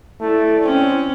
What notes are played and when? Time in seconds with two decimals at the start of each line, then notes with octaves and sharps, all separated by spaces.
0.21 A3 E4 D5
0.64 C4 C#4